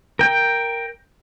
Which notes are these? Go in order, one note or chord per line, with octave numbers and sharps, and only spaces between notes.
A#4 G5